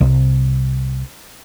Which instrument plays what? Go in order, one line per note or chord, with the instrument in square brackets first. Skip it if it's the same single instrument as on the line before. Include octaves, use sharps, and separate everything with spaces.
[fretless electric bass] C2